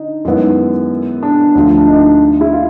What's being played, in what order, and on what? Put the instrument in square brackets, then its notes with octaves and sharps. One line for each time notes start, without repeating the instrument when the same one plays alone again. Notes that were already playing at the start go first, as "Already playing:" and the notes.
Already playing: [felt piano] D3 [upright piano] D#4
[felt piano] F#2 D#3 G#3 B3 E4
[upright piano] D4
[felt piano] D2 D3 F3
[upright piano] D4
D#4
E4
F4